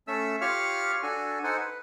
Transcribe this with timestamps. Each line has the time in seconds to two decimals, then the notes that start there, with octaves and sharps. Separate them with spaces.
0.08 A3 C#4 A4 E5 E6
0.41 F4 G4 C#5 F5 C#6 F6
1.03 D4 F#4 A4 G#5
1.44 D#4 A4 C5 F#5 G#5
1.60 B4